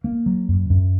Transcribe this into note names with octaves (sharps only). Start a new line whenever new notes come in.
A#3
F#3
F#2
F#2